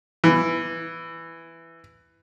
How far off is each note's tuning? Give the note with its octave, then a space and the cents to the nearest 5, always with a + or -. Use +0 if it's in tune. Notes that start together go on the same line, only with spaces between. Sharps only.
E3 +5